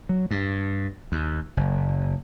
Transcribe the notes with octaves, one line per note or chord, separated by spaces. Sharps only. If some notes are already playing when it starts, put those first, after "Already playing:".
F#3
G2
D#2
F#1